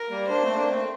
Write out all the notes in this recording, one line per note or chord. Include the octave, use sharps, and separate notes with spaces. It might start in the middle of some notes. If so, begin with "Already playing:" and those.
Already playing: A#4
G3 A#3
A#3 D4 C5
A3 C4
A#3 D4
A3 C4